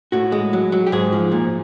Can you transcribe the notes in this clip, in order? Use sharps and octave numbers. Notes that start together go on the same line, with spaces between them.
A2 F#4
G#3
F#3
F#3
G4
G#2 G#4
F3
A#2